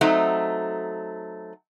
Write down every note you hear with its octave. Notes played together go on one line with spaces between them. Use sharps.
F#3 A3 C4 D#4